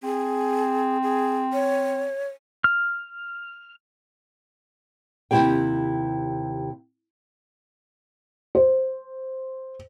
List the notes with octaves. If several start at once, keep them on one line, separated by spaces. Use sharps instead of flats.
C4 G#4
G#4
C#5
F6
D#2 C3 E3 E4 G4 G5
C5